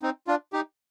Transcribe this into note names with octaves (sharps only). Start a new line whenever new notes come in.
C4 D#4
D4 F4
D#4 G4